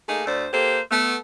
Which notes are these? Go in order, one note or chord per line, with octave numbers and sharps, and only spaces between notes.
A3 A#3 D#4 G#4
D2 A3 C5 D5
A#3 G4 A4 C5
A3 B3